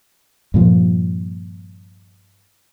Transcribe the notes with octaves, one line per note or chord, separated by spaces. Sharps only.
G2 A#2 F3